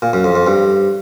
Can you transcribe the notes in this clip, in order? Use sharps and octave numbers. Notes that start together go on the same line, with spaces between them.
A#2
F#2
F2
F2
G2